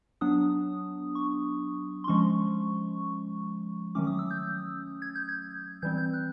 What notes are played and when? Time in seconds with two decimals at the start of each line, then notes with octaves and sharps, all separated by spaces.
0.21 F#3 B3 D4 D#6
1.15 C#6
2.04 C6
2.08 F3 G#3 C#4 C#6
3.95 D#3 F#3 A3 C#4 D6
4.07 D#6
4.19 E6
4.31 G6
5.02 G#6
5.15 G6
5.29 G#6
5.82 E3 G3 C4 G6
5.98 G6
6.14 F#6